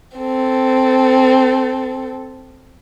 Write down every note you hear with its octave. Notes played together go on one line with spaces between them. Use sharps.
C4 A4